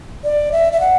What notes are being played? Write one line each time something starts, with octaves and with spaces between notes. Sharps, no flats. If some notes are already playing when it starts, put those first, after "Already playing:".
D5
E5
E5
F#5